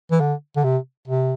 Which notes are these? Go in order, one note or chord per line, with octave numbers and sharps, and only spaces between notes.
E3
D3
D3
C3
C3